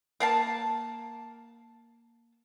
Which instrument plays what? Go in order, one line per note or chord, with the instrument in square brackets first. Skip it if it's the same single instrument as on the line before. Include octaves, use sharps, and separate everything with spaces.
[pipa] A#3 F5 A5